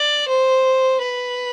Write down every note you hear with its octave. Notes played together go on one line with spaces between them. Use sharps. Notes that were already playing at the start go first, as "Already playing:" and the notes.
Already playing: D5
C5
B4